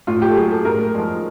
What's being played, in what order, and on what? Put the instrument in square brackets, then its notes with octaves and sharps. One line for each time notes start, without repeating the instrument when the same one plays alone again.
[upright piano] A2 F4
G4
A4
F#3 G#4
A4
A2 A#4
F3 G#3